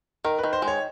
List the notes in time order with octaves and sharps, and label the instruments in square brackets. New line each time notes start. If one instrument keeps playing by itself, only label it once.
[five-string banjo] D#3 [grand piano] A#4
[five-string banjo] D#3 [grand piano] B4
[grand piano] C5
[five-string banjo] G#3
[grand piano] C#5